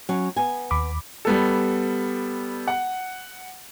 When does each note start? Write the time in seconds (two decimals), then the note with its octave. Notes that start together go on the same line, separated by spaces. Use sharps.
0.09 F#3 C#4
0.36 B3 G#5
0.71 D#2 B5 D6
1.25 G3 B3 A4
2.68 F#5